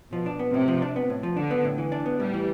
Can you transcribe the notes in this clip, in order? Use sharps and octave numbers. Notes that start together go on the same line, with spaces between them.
B2 F3
D4
B3
A2 C3
F3
D4
B3
A2
F3
D3 D4
B3
A2
E3
D4
B3
A2 G3
E3